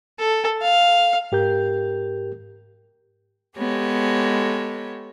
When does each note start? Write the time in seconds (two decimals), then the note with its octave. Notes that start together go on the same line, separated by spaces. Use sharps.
0.19 A4
0.62 F5
1.32 G#2 G4 A#4 G6
3.57 G#3 B3 G4 A4 C#5